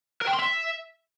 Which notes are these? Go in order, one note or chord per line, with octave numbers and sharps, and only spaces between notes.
A#4
G5
C6
E5